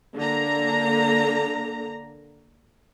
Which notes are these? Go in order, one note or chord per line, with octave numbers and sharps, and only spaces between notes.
D3 A#3 A#5